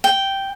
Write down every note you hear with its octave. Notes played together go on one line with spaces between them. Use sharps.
G5